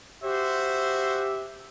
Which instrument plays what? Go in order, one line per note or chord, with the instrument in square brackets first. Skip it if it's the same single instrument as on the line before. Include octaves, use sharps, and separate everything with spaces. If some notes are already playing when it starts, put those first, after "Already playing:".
[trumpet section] F#4 C5 [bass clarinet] G4 [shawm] E5